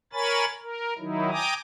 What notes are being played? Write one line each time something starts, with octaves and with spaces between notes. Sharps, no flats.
A#4 C#5 G#5 B5 A6
A#4
D#3 F#3 D#4 E4
G5 G#5 A#5 D6 D#6